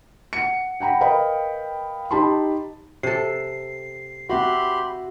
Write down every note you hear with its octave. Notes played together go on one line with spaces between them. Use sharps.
F#5 C#7
F#5 G5 A#5 B5
A#4 B4 D#5 F5 G5 B5
D#4 G4 A5 B5 C6
C3 A4 C7
C4 F#4 G4 E5 F#5 B5 C6